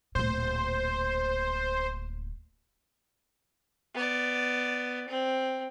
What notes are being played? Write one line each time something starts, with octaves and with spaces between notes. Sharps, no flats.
D1 A#2 C5
B3 D5
C4